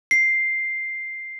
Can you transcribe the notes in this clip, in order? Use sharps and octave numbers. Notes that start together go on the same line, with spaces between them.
C7